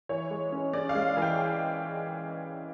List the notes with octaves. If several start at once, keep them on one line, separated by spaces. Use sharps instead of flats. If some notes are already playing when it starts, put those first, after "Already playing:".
E3 C#5
G#3
C#4
C#4 D5
F5
G#3
E3
G5